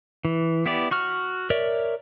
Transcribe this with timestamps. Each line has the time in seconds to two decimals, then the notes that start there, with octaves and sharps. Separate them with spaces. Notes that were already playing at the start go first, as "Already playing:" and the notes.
0.25 E3
0.66 B3 E4 G4 D5
0.91 F#4 C#6 F6
1.50 A#4 C#5 D5 E5